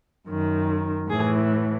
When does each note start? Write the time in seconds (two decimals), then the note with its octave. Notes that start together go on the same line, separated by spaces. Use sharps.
0.27 F#2 D#3
1.09 A2 E3 G#4